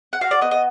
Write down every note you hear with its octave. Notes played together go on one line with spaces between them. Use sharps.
F#5
F#4 F5
D5
B3 D#5
D#5